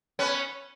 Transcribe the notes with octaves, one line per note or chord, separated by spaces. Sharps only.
B3 C#4